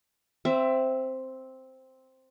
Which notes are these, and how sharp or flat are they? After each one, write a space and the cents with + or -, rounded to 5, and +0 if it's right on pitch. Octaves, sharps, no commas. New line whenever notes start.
C4 +0 E5 +15